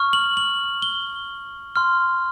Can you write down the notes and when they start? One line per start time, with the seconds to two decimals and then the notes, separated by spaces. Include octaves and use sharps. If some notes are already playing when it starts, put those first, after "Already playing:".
Already playing: C#6 F6
0.13 F#7
0.37 F#7
0.82 G7
1.76 C6 F6